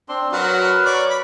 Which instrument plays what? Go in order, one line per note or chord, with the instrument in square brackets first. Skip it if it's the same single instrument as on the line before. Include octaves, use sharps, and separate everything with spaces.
[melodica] C4 D4 C6
[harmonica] F#3 F#4 [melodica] A#4 B4
[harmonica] C#5 D5
B5